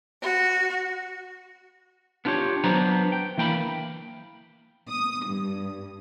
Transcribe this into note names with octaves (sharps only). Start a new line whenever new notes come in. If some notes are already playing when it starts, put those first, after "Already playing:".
F#4
B3 D4 F4 G4 C#5
F#3 B3 D4 C5 A#5
G5
E3 A#3 G5 A#5 B5
D#6
G2